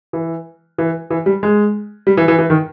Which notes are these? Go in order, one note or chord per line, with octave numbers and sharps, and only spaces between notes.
E3
E3
E3
G3
G#3
G3
E3
E3
E3
D#3